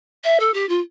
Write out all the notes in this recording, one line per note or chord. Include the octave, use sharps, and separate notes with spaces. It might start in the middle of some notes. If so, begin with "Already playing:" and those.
E5
A4
G4
F4